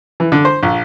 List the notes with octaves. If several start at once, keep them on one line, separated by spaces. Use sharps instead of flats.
E3
D3
C5
A#1